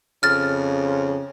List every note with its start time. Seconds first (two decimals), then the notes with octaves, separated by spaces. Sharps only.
0.23 F2 C#3 F6 A6